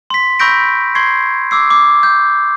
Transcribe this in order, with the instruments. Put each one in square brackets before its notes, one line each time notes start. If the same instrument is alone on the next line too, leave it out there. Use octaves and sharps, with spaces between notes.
[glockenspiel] C6 B6
B5 C#6 E6 G6 A#6 D7
C6 C#6 G#6 C7
D6 E6 C7
D6
G6